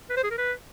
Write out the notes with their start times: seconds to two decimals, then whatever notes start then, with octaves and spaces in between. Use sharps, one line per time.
0.10 B4
0.17 C5
0.24 G#4
0.31 A#4
0.38 B4